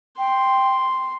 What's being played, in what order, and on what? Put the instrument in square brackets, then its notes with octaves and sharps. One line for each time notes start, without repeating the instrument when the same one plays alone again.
[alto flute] G5 [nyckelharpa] C6